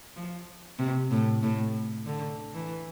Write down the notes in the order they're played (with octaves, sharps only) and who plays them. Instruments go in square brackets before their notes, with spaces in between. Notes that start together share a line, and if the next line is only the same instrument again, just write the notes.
[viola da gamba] F3
C3
A2
A2
D3
E3